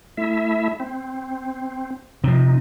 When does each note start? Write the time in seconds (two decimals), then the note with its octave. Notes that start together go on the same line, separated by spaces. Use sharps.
0.17 A3 E4 E5
0.80 C4
2.24 C3 F3 D#4